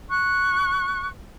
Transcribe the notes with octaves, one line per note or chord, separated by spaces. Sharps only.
C#6 F#6